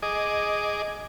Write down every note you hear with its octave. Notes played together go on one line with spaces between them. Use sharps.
G#4 D#5 D6